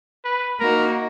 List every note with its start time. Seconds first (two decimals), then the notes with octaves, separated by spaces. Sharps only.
0.24 B4
0.59 A#3 D#4 F#4 A#4